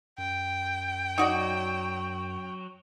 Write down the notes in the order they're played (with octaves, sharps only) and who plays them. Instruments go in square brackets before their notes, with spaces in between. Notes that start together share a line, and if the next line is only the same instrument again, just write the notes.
[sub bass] F#2 [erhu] G5
[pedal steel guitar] F#3 [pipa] D#4 F#4 D5